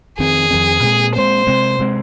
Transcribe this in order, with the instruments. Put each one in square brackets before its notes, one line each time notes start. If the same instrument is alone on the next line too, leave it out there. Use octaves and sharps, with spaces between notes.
[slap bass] F2 D#3 C4 [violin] G#4
[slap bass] F2 D#3 C4
A#2 G#3 C4
[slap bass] A#2 G#3 C4 [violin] C5
[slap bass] C3 G#3 C4
C3 G#3 C4